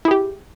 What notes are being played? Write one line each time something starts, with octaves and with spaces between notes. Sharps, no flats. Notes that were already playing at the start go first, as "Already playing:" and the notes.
E4 G4 G#4